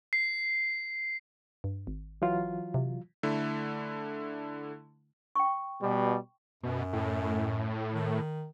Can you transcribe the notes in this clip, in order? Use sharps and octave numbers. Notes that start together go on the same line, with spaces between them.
C7
G2
G#1
E3 F#3 F4
C3
D3 A3 E4
G5 C#6
B2 G3
F#2 B2
A2
D#3